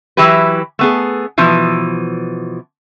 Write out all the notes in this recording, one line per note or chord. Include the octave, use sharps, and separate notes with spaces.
E3 F#3 E4 G4 B4
A3 B3 G#4
B2 E3 F3